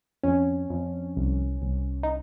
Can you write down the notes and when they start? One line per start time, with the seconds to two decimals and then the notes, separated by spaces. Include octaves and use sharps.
0.23 F2 C#4
0.70 F2
1.17 C2
1.62 C2
2.03 D#4